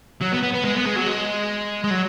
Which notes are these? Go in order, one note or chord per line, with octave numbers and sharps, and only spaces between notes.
F#3
B3
B3
B3
G#3
B3
G#3
F#3
G#3
G#3
F#3